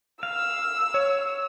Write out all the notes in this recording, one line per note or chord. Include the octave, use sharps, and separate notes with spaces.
F5 E6
C#5